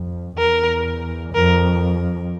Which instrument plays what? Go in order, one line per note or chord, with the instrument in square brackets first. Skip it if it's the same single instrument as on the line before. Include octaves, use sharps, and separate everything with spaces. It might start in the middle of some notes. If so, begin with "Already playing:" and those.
Already playing: [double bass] F2
[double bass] E2 [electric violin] A#4
[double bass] F2 [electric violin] A#4